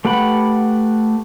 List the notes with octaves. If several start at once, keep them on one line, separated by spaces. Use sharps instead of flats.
A3 G4 B4 F#5 B5